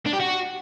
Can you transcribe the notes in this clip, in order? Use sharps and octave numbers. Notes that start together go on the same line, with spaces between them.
D4
G4
F#4